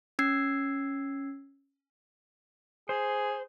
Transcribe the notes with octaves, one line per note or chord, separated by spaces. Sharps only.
C#4 E6 G#6 C7
G#4 C5